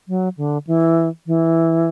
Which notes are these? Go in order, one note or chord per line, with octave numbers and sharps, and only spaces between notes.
F#3
D3
E3
E3